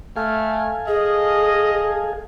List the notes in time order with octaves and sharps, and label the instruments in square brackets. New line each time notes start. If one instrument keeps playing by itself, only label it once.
[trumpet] A3 [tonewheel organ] A4 F5 G#5 [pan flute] F6
[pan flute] G#4 [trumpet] D#5